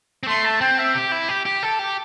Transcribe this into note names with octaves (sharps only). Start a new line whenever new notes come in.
C4
A3 C6
A5
C4 G5
E5
G4
E4
G4
G4
A4
G4